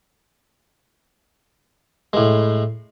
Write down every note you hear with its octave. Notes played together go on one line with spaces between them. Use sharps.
A2 G#3